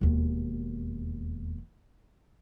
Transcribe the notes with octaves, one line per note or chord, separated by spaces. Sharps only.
E1 D#2